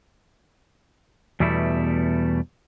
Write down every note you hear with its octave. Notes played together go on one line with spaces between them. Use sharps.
E2 B2 G3 A3 E4